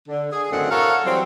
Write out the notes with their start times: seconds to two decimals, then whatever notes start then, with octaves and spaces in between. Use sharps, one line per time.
0.07 D3
0.31 G#4
0.51 F#2 A2 D3 D#3 C4 F#5
0.71 E4 A4 A#4 C#5 F5 F#5
1.05 E3 F#3 G3 C4